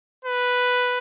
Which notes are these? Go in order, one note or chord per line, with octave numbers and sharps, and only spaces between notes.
B4